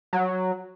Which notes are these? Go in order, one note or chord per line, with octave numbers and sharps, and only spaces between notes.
F#3